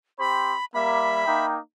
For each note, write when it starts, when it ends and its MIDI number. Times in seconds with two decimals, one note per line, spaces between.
0.19 0.55 60
0.19 0.55 67
0.19 0.55 72
0.19 0.65 83
0.75 1.24 55
0.75 1.24 58
0.75 1.46 76
0.75 1.45 83
1.26 1.58 58
1.26 1.58 63
1.26 1.58 79